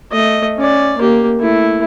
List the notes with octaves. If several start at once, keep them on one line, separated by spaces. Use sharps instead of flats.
A3 D#5
C#4 D5
A#3 G4
A3 E4